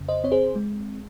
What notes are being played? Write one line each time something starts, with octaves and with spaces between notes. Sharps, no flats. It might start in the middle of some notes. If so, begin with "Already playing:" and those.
Already playing: F2 C#3
C5 D#5
C4 C#5
G#4 C5
G#3